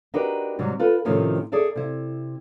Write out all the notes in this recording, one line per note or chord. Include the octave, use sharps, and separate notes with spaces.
D4 D#4 F#4 G4 A#4 B4
G#2 C3 F#3 G3
F4 A4 B4
A2 C3 D#3 F3 A3 C#4
G#4 A4 D5 E5
C3 E4